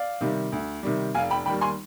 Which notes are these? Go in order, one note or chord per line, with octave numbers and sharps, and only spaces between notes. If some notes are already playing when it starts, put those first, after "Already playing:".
Already playing: D5 F5
C3 D#3 G3
D2
C3 D#3 G3
F1 F5 G#5
G5 B5
D#2 D#3 G3 G5 B5
G#5 C6